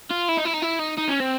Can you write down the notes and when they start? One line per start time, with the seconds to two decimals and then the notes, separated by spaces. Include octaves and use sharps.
0.11 F4
0.29 E4
0.38 D#4
0.45 E4
0.54 D#4
0.63 E4
0.80 D#4
0.98 D#4
1.09 C#4
1.20 C4